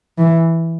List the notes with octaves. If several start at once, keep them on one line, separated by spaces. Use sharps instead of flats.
E3